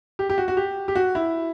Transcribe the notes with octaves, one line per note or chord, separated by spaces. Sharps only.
G4
G4
F#4
F#4
G4
G4
F#4
E4